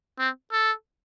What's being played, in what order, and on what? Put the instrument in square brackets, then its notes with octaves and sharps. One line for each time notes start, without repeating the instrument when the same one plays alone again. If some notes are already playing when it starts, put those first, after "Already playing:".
[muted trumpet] C4
A4